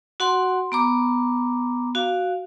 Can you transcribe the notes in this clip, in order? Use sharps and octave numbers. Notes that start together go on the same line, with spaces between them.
F#4 F#5 C6
B3 A#5 D6
F#4 F5